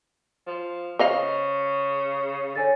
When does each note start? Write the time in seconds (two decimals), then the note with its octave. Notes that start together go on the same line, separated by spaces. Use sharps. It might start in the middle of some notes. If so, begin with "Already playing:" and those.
0.46 F3
0.99 C#3 C5 D#5 F5
2.55 D3 C#5 G#5 A6